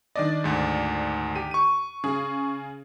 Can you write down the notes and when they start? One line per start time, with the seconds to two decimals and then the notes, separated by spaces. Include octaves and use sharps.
0.16 D#3 D4 D5 D#5
0.44 D2 G#2
1.35 G4 D#7
1.51 C#6 D#7
2.04 C#3 G#4